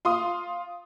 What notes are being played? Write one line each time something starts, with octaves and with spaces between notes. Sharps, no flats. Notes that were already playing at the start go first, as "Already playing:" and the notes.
F4 C6 D#6